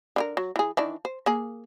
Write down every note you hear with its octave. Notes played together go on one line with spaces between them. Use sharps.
D3 F4 A#4
F#3
E3 G#4
D#3 E3 D4
C5
A#3 G#4